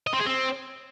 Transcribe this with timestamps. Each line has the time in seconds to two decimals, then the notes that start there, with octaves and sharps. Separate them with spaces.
0.07 D#5
0.13 C4
0.20 G#4
0.26 C4